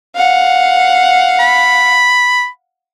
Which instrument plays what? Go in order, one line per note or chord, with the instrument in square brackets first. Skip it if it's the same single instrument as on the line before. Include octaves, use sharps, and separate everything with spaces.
[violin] F5 F#5
[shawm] B5